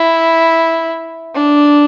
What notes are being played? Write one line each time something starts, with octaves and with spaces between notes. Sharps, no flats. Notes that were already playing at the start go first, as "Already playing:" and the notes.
Already playing: E4
D4